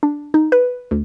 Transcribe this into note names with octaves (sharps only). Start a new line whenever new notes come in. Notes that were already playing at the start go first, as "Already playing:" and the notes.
D4
D#4
B4
D2